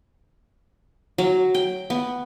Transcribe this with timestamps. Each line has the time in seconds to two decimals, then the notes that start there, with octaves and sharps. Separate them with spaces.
1.18 F#3
1.55 G5
1.90 B3